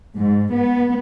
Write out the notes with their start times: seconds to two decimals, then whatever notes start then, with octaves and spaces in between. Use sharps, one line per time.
0.15 G#2
0.53 B3